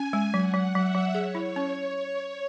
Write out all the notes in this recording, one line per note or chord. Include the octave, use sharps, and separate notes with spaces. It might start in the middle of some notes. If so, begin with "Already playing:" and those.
Already playing: C#4 G#5
G#3
F#3 F#5
F#3
F#3 E5
F#3
G#4 C#5
E4
C#4